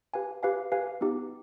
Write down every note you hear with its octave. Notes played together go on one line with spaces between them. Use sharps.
G4 B4 F5 G#5
G4 B4 F5 G#5
G4 B4 F5 G#5
B3 D#4 G4